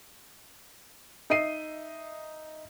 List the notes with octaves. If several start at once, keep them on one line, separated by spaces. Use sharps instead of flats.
D#4 D#5 E5 C7 D#7